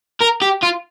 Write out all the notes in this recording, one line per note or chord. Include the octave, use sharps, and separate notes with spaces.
A#4
G4
F4